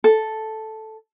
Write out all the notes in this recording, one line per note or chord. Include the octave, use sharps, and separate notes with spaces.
A4